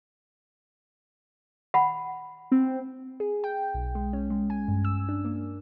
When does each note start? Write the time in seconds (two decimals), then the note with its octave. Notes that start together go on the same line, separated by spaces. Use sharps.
1.74 F#5 B5
2.52 C4
3.20 G#4
3.44 G5
3.74 B1
3.95 G#3
4.13 C#4
4.30 G#3
4.50 G#5
4.68 G2
4.85 E6
5.09 D4
5.25 A#3